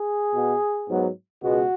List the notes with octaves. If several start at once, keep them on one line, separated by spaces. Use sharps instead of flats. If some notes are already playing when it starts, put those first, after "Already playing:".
Already playing: G#4
B2 B3
G#2 F#3 B3
C#2 B2 G#3 B3 F#4